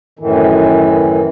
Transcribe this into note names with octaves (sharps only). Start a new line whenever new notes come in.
F#2 A2 D#3 E3